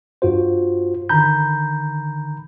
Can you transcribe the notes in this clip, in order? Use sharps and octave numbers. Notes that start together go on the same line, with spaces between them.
G2 F4 F#4 C5
D3 D#3 A#5 B5 G6